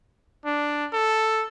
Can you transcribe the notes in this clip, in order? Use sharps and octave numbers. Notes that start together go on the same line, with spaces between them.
D4
A4